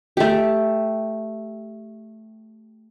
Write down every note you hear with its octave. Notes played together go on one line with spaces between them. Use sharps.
A3 G4